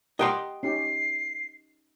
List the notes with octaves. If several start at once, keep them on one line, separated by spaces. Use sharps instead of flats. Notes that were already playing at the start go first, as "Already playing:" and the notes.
G4 A#4 D#5 F#5 G5 C6
C#4 D#4 G4 C7